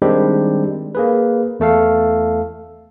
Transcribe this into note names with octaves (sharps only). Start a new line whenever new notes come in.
D#3 G3 G#3 C4 D4 G4
A#3 G#4 B4
E2 A3 A4 F5